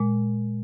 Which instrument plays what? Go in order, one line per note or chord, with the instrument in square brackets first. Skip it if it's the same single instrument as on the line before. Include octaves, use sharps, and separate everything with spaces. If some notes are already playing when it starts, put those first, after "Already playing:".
Already playing: [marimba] A#2 G#3